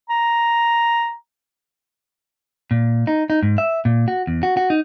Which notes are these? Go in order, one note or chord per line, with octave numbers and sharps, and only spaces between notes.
A#5
A#2
D#4
D#4
G#2
E5
A#2
F#4
E2
F#4
F#4
D#4